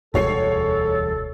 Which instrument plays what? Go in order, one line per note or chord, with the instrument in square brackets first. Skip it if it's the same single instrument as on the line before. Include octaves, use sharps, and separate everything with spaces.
[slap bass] E1 D2 G3 [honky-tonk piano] G#3 C#5 C7 [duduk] A4